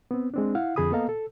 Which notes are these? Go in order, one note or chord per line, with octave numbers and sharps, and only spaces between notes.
B3 C4
G#3 C4 D4
E4 F5 F#5
F2 D3 G#4 B5 D#6
A#3 B3 A4 D#5 F5 A#5
A4